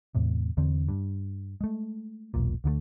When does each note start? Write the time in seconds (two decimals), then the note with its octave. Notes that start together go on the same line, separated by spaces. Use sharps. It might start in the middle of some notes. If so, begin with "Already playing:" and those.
0.15 E2 A2 C3
0.57 E2 D3 C4
0.89 G2
1.61 G#3 A3
2.34 E1 B1 A#2
2.64 D2 D3 E3 A3